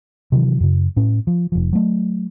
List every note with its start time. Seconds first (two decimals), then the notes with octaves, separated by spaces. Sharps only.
0.32 C3 D#3 E3 F#3
0.60 F#2 C#3
0.96 A2 C#4
1.27 F3
1.52 F1 F3
1.73 F#3 A3